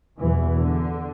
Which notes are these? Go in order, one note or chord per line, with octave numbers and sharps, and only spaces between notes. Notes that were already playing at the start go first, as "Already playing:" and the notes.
E2 B2 E3
D3